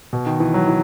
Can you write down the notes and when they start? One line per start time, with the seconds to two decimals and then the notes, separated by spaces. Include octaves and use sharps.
0.13 B2
0.26 D#3
0.40 E3
0.54 F#3
0.68 E3